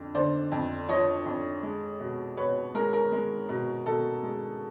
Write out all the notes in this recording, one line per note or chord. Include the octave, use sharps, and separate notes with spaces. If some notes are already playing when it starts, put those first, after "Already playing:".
Already playing: F2 D3
D3 C5 D5
F2
F3 C#5 D#5
F2
G#3
B2
B2 B4 C#5
G#3 A#4
A#4
G#3
B2
B2 A4
G#3